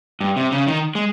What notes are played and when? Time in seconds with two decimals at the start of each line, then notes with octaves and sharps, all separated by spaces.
0.21 G2
0.36 C3
0.52 C#3
0.67 D#3
0.95 G#3